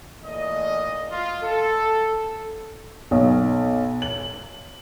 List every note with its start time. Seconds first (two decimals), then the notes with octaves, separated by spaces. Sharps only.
0.24 A#2 E3 A3 D5 D#5
1.10 F4
1.43 A4
3.11 B1
4.02 F#7